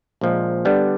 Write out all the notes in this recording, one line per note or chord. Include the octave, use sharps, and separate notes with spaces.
A#1 A#2 F3 G#3
D3 G3 B3 D4